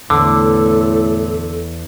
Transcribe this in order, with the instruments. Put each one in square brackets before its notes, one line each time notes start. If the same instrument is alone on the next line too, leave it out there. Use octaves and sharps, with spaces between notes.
[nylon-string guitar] E2 [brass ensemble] A2 [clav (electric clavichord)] D3 [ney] A4